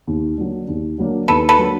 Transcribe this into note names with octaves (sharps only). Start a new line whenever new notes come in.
D#2
D3 F#3 A#3 D4
D#2
D3 F#3 A#3 D4
D#2 A4 B4
A4 B4
D3 F#3 A#3 D4